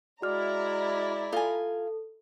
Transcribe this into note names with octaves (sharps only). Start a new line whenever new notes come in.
G#3 E4 F#4 D5 A#5 F6
F4 A4 G#5